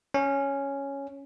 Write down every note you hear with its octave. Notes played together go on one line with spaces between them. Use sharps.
C#4